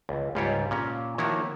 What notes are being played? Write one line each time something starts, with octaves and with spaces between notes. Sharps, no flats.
C#2
C#2 G#2 G3 F4 G4 C#5
A#2 C#4 A#5
D#3 F3 A#3 E4 F#4 C#5